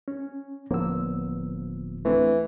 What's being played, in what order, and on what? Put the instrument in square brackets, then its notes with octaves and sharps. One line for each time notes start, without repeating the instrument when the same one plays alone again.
[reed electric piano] C#4
[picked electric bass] D1 F3 B3 [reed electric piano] A#3 E6
[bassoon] E3 [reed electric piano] A3 C4 D4